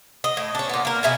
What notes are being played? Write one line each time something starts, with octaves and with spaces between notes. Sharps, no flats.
D#5
A2
C#4 D4
A#2 B3
A#3 A#4
B2 E4 G#5